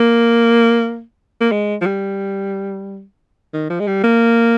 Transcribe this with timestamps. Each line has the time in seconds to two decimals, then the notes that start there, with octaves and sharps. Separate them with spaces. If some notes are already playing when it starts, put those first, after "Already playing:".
Already playing: A#3
1.41 A#3
1.52 G#3
1.82 F3
1.86 G3
3.54 D#3
3.70 F3
3.80 G#3
3.87 G3
4.04 A#3